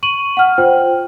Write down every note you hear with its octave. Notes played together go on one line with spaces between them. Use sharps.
C#6 D#7 F#7
F#5 F6
F4 C5 G5